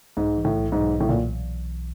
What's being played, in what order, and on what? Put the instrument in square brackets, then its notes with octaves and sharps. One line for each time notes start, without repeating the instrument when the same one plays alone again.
[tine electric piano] B1 [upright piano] G#2
[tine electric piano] E3
[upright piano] A2
[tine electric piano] B1
[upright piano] G#2
[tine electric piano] B1
[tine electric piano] B1 [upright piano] A2
[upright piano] A#2